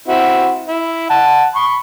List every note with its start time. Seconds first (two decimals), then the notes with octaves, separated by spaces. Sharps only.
0.08 C4 E4 F#4
0.67 E4
1.10 F#5 A5
1.55 B5 C#6